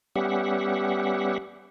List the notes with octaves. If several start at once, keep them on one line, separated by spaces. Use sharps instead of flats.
G3 B3 C#4 G4 E5 F#5